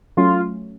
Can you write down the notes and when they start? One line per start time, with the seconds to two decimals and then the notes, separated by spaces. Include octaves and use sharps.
0.17 F#3 A3 C#4 F4